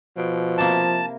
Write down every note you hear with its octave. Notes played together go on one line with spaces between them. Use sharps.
B2 F3
C3 A#3 E4 A5